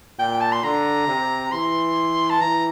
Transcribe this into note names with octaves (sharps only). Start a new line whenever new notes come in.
A#2 G5
A5
C6
D3 A#5
C3
E3 C6
A5
E3 A#5